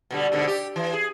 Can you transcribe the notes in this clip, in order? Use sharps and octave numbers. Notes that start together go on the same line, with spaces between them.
B2 D3 G3
G#2 B2 D3
G4
E3
G#4